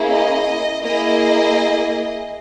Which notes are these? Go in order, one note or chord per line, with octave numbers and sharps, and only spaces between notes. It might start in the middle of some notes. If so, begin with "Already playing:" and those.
Already playing: A#3 C#4 E4 G#4
D#5
A#3 E4 G#4 D#5